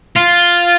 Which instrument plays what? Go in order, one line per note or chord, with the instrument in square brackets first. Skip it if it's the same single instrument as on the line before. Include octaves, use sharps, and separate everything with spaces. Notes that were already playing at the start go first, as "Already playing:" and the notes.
[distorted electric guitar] F4